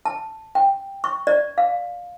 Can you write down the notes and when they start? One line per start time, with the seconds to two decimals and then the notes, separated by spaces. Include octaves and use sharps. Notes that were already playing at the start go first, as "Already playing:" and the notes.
0.05 A5
0.55 G5
1.04 C#6
1.27 D5
1.58 F5